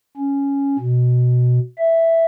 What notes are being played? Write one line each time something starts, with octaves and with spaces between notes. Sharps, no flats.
C#4
B2
E5